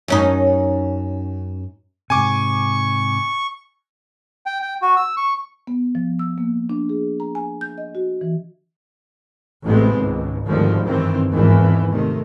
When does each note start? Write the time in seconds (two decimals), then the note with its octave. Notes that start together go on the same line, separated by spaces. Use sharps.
0.08 F#2 C#4 D#4
2.10 G#2 C3 G#5 C#6 D6
4.46 G5
4.62 G5
4.82 F#4
4.97 E6
5.17 C#6
5.67 B3
5.95 F3
6.19 E6
6.38 A#3
6.70 D4
6.89 G#4
7.20 A#5
7.35 G#5
7.61 G6
7.78 D#5
7.95 F#4
8.21 E3
9.64 A1 A2 C3 G#3 B3 C4
9.97 G#1 C#2
10.45 G#1 D2 D#3 F3 G3
10.85 G2 D#3 E3 C4
11.32 G#1 E2 D#3 E3
11.90 C3 D#3 A3